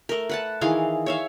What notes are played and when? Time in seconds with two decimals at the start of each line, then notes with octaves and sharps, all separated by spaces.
0.09 A3 A#4
0.29 B4 F#5 A5
0.61 D#3 E3 G#4 F5
1.06 C#5 E5 F5